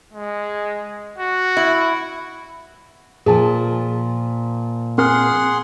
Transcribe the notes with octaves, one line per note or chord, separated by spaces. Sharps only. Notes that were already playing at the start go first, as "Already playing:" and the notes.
G#3
F#4
E4
A#2 F3 G#4 A5
C4 G#4 A#4 F#5 C6 F6